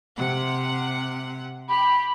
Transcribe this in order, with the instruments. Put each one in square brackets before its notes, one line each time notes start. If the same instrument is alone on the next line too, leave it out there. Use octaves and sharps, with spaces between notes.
[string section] C3 F#5
[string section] G4 [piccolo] B5